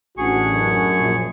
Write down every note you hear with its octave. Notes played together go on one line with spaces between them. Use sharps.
A1 D4 F#4 G#4 C#6
F#2
A#1